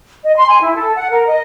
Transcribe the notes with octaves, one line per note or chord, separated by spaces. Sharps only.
D#5
C6
G#5
E4
A4
F#5
A#4
D#5